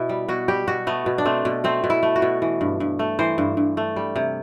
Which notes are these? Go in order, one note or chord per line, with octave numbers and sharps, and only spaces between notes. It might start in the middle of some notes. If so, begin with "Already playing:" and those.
Already playing: B2 E4
G3
B2 F#4
G3 G4
B2 F#4
A3 B3
B2
D4
A3 C4
B2
A3 C4
B2
E4
A3
F#4
B2
E3
G2
G2
A3
E3 C5
G2
G2
A3
G3
C3